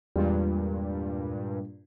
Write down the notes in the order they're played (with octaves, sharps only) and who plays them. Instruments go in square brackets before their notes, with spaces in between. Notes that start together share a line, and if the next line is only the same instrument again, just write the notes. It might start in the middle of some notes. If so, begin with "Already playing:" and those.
[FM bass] E2 [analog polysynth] G2 A#2 [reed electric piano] G3 G#3 F4